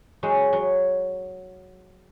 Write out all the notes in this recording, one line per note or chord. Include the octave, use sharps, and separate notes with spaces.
F#3 G#3 D#4
F#3